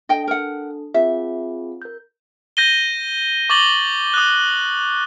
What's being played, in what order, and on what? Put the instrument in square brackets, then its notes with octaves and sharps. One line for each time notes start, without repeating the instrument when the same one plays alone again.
[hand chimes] D4 A4 [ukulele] D#5 G5
[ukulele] A#4 F#5
[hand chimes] C4 F4 G#4 [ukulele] E5
[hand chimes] A#4 G6
[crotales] G6 A#6 D#7 G7
C#6 D6 A6 F#7 G7
D#6 F#6